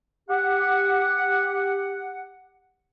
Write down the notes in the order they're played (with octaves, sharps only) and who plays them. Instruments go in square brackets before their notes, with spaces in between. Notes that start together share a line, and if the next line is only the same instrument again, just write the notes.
[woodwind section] G4 F#5